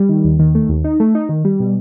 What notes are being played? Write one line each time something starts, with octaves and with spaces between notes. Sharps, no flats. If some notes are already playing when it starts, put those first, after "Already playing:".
Already playing: G3
D#3
D#2
D#3
A3
D#2
D#4
A3
D#4
D#3
G3
B2